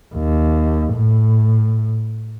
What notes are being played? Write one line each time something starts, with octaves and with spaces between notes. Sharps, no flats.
D#2
A2